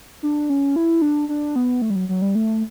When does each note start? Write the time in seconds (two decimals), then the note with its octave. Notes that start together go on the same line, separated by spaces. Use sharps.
0.23 D4
0.50 C#4
0.76 E4
1.02 D4
1.29 D4
1.56 B3
1.82 A3
1.90 G3
1.96 F#3
2.09 F#3
2.22 G3
2.35 A3